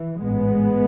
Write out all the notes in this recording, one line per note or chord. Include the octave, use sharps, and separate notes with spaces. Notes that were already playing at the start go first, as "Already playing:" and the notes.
Already playing: E3
A1 G#2 G#3 B3